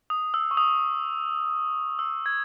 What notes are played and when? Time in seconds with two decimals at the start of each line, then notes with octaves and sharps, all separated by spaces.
0.10 D#6
0.34 E6
0.51 C#6
0.57 D#6
1.99 E6
2.26 G#6